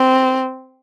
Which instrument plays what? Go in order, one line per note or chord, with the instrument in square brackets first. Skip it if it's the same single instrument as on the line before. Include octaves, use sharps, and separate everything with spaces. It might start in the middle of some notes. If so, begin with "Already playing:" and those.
Already playing: [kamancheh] C4